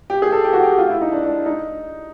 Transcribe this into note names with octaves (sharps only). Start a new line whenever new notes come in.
G4
G#4
A4
G4
F#4
G4
F4
E4
D#4
D4
D4
D#4